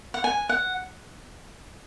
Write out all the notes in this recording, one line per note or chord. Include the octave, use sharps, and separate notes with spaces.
F#5
G#5
F#5